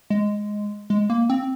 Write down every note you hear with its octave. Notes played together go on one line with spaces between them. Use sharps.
G#3
G#3
A#3
C4